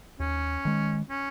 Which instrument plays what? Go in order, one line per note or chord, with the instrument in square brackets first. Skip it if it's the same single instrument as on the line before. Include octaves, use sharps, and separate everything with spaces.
[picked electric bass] D#2 [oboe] C#4
[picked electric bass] D#3 G#3
[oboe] C#4